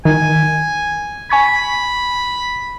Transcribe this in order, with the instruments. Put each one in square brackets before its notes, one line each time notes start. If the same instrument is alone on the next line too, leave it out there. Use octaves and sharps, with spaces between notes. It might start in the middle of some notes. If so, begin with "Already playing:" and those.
[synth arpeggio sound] D#3 [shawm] G#5
[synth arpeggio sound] G#5 C#6 G#6 [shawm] B5